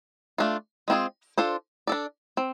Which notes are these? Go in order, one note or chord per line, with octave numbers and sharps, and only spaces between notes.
A3 D4 F4
G#3 C4 F4 G#4
D4 F4 A4 C5
D4 A4 D5
C4